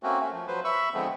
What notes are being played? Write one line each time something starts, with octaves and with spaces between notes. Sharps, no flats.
A3 A#3 C4 C#4 F#4
A3 C#4
F3
F3 F#3 B4 C5
E5 B5 C#6 E6
D3 F3 G#3 A3 B3 C4